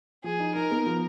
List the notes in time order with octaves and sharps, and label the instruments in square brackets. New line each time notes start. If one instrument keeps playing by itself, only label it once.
[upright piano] F3 [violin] G#4
[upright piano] D#4
[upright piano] D#4 [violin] A#4
[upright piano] B3
F3